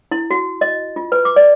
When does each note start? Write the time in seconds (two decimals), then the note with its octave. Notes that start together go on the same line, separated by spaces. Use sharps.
0.11 E4
0.31 F#4
0.61 D#5
0.96 F4
1.12 B4
1.25 D6
1.36 D5